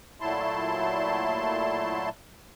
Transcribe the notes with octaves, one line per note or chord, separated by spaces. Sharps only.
A#2 F#3 A3 E4 A5 C6